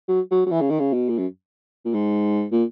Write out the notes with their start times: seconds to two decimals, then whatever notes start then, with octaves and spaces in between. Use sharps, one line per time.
0.08 F#3
0.31 F#3
0.46 F#3
0.51 E3
0.61 C#3
0.70 D#3
0.80 C#3
0.93 B2
1.09 A#2
1.18 F#2
1.85 A#2
1.94 G#2
2.52 A#2